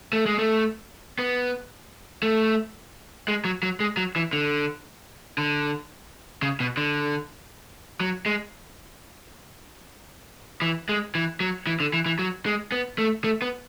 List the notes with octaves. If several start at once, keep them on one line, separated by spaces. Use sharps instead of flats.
A3
G#3
A3
B3
A3
G#3
F#3
F#3
G#3
F#3
E3
D3
D3
C#3
B2
D3
F#3
G#3
E3
G#3
E3
F#3
E3
D3
E3
E3
F#3
G#3
B3
A3
A3
B3